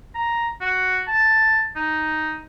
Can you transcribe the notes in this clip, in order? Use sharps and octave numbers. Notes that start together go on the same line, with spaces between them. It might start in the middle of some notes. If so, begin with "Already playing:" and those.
A#5
F#4
A5
D#4